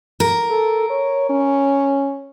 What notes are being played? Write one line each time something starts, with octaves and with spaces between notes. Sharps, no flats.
A#4
A4
C#5
C#4